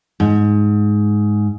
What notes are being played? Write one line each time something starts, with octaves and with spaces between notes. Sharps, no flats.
G#2